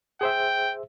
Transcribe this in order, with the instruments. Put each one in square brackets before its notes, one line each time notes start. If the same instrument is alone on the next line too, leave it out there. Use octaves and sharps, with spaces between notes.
[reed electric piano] G#4 C5 E5 [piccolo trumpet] G5